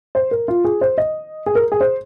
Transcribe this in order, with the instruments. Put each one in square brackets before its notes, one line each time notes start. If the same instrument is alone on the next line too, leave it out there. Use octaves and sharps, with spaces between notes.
[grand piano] C5
A#4
F4
G#4
C5
D#5
G#4
A#4
G#4
C5